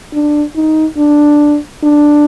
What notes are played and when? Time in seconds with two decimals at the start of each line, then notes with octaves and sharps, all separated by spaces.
0.13 D4
0.56 D#4
0.98 D4
1.83 D4